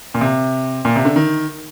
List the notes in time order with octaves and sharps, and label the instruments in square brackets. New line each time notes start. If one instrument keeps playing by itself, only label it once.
[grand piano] A#2
C3
A#2
C3
D3
D#3